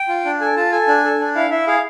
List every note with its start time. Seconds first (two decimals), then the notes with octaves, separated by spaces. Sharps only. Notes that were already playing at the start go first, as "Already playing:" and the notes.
Already playing: G5
0.08 F4
0.25 D4
0.41 A4 G#5
0.56 F4 A5
0.72 A4 G#5
0.88 D4
1.04 A4
1.20 D4
1.35 E4 F5
1.51 E4 E5
1.67 G#4 F5